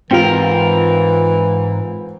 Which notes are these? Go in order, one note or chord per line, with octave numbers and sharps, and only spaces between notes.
G#2 E3 C4 F4 A#4